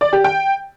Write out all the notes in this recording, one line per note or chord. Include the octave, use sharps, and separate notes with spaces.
D5
G4
G5